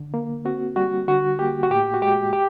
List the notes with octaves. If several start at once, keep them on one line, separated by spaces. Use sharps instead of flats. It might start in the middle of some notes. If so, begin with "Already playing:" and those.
Already playing: D3
A#3
C4 F#4
G3 F#4
D3 F#4
A#3 G4
F#4
A2 G4
F#4
G#3 G4
G4